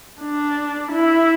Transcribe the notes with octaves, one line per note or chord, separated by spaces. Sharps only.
D4
E4